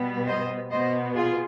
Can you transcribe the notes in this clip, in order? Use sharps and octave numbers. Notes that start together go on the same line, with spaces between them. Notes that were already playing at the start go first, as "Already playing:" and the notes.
Already playing: B2 G3 B3
C5 D#5
B2 B3 C5 D#5
F4 G#4